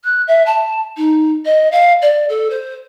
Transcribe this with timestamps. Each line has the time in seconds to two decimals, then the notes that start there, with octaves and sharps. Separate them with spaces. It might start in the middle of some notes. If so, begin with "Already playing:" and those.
0.04 F#6
0.27 E5
0.46 A5
0.97 D#4
1.45 D#5
1.71 F5
2.02 D5
2.29 A4
2.50 C5